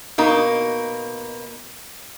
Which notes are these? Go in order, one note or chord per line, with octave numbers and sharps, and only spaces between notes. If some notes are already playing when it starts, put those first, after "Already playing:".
B2 A#3 D#4